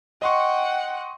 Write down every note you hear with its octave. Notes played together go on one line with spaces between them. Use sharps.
D#5 F#5 G5 C6 C#6